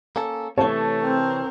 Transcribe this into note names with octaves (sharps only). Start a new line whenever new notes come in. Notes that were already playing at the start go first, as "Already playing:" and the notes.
A#3 C#4 A4
C3 E3 A3 C#5 A5
C4 A#4